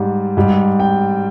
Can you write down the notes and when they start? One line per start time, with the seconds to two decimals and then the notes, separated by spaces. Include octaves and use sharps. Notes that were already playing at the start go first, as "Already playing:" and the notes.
Already playing: G#2 G3
0.37 G#2 G3
0.80 G5